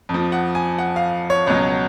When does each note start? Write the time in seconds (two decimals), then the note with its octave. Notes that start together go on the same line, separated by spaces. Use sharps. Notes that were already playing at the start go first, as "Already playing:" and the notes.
0.09 F2
0.14 F3
0.32 F#5
0.55 G#5
0.78 F#5
0.96 F5
1.30 C#5
1.46 C#2 B2 F#3 C#5